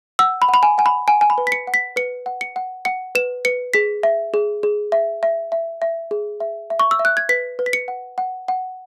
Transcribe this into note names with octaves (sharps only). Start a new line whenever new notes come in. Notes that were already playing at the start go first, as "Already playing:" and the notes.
F#5 E6
B5
F#5
B5
G#5
F#5 G#5
B5
F#5 G#5
G#5
B5
B4
B6
C#7
F#5
B6
B4 C#7
F#5
C#7
F#5
F#5 C#7
B4 E7
B4 C#7
G#4 B6
E5
G#4
G#4
E5
E5
E5
E5
G#4
E5
E5
C#6
E6
E5
F#6
G#6
B4 B6
B4
B6
C#7
F#5
F#5
F#5